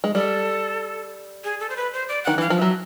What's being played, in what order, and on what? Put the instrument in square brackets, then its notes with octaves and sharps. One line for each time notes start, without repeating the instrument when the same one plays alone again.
[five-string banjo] G#3
[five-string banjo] G3 [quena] A4
[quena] G#4
A4
C5
B4
C5
D5
[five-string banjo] D#3 [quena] F#5
[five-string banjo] E3 [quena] F5
[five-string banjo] F3
[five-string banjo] F#3 [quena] E5